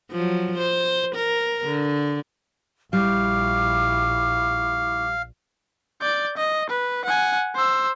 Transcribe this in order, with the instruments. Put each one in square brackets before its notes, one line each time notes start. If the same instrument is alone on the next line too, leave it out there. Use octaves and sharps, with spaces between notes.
[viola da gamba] F3 F#3
C5
A#4
D3
[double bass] A#1 [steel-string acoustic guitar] G3 [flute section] E4 C#6 D6 [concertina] F5
[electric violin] D5 G6
D#5
B4
F#5 G#5
C5 E6